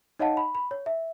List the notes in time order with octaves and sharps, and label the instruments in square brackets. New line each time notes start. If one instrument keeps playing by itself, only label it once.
[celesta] D#4 C#5 D#5 F5 F#5 A5
B5
B5
C#5
E5